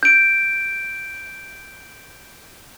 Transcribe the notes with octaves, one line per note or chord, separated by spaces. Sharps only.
G6 D7